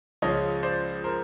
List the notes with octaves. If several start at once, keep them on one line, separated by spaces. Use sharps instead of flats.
C#2 C#3 F3 G#3 C#5 D#5
C5 D5
A#4 C5